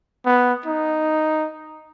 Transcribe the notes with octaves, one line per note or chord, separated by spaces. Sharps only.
B3
D#4